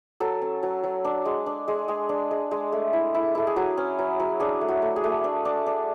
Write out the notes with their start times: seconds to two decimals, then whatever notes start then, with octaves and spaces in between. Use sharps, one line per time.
0.20 F#3 A4
0.42 C#4
0.63 F#3
0.83 F#3
1.05 D4
1.25 G#3
1.46 D4
1.68 G#3
1.88 G#3 G#4
2.09 D4
2.31 G#3
2.51 G#3
2.72 A3
2.93 E4
3.14 E4
3.35 E4 A4
3.47 G#4
3.56 F#3 F#4
3.77 C#4
3.98 F#3
4.20 F#3
4.40 D4 G#4
4.61 A3
4.68 F#4
4.82 A3
4.96 G#4
5.04 A3
5.24 D4
5.45 D4
5.66 D4